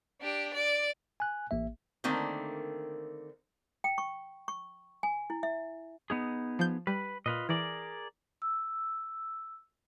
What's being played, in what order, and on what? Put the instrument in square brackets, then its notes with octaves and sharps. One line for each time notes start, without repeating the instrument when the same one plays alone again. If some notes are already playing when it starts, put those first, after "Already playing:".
[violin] D4 G4
D5
[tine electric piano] G#5 F#6
A1 A#3 E5
[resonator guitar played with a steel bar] D3 D#3 A3 A#3 C4
[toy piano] G5
C#6
C#6
G#5
E4
E5
[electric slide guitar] B3 D#4 G#4
[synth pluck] F3 G6
[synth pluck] G3 [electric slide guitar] B4
[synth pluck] A#2 [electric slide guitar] F4 B4 D#5
[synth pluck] E3 [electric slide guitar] G#4 A#4 D5
[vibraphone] E6